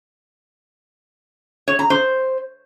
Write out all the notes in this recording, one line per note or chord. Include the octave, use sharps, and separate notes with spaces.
C#5
A#5
C5